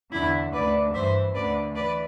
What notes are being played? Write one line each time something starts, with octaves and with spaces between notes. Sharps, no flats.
E2 D3 E4
D2 D3 B4 D5
G2 E3 C5 E5
D2 D3 B4 D5
E3 B4 D5